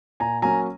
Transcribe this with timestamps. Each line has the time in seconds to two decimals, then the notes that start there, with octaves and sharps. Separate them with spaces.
0.20 A#2 G#5 A#5
0.42 F#3 A#3 C#4 G#5 A#5